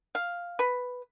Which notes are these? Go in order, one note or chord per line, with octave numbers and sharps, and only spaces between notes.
F5
B4